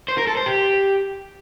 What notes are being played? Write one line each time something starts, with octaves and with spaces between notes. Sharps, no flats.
C5
A#4
A4
C5
G4